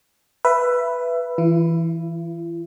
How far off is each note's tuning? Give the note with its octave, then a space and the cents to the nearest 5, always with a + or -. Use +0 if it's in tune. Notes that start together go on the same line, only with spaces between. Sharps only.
B4 +0 E5 +20
E3 +0 E4 +45